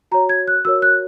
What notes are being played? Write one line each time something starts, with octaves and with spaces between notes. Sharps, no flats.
F#4 C#5 A#5
G#6
F#6
F#4 A#4 C#5 E6
F#6